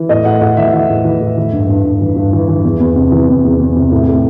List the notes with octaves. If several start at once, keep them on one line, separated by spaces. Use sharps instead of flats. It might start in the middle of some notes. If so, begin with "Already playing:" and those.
Already playing: E3
A2 D#5
A2 F#5
A2 F#5
E3 E5
E3 E5
A2
E3
A2
E3
G2
G2
G2
E3
G2
E3
E3
E2
E2
C3
E3
E2
E2
E2
C3
A2
A2